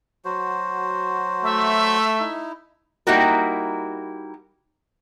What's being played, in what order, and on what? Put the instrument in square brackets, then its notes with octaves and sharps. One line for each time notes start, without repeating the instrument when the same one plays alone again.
[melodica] F#3 F#4 C5
[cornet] A3 [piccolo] E5
[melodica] D#4 E4
[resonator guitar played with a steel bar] G3 A#3 D#4 E4 F#4 A#4